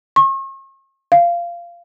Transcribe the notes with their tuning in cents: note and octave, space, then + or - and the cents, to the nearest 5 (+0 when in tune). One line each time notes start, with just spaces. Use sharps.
C#6 -40
F5 -15